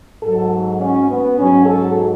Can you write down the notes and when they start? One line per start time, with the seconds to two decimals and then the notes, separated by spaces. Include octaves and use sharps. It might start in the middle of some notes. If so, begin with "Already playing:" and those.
0.22 G#2 F#3 A4
0.81 C#4
1.08 B3
1.37 G#2 F#3 C#4
1.66 A4